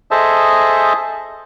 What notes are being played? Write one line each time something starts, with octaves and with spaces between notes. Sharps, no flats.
G#4 A4 C5 D#5 E5 A5